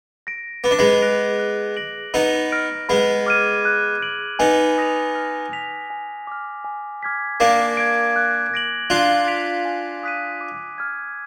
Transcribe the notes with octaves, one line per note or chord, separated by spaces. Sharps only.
A#6 D7
B3 D6
D4
G#3 B3
F#6 A#6 D7 F7
F#6
A#6 D7 F#7
B3 D#4 B5
F6 A#6 D7
G#3 B3 B5
D6 F6 G#6 D#7
F#6
D7 F#7
B3 D#4 G#5
D#6 A#6 F7
F6
B6 F7
G#5
D6 F6
G#5
D6 F6 G#6 B6
A#3 D4 D6
G#6 D7
F#6
A#6 D7 F#7
D4 F4 F#6
B6 D7 F7
G#5
D#6 F#6 B6 D#7
D6
F6 G#6